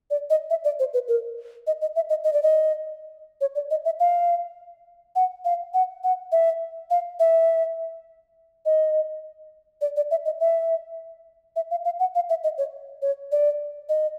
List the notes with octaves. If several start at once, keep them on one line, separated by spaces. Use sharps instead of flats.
D5
D#5
E5
D5
C5
B4
A#4
D#5
D#5
E5
D#5
D#5
D5
D#5
C#5
D5
D#5
E5
F5
F#5
F5
F#5
F#5
E5
F5
E5
D#5
D5
D5
E5
D#5
E5
E5
F5
F5
F#5
F5
E5
D#5
C#5
C#5
D5
D#5